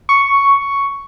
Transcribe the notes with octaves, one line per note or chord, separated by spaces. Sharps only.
C#6